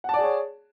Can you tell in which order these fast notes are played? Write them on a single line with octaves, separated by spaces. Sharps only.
F#5 A5 D5 G#4 C#5